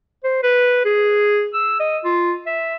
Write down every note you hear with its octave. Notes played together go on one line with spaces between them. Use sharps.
C5
B4
G#4
E6
D#5
F4
E5